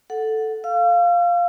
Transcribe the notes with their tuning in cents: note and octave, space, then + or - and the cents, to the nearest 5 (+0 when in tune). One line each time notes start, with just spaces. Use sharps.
A4 +0 F#5 -5
F5 +0 E6 +45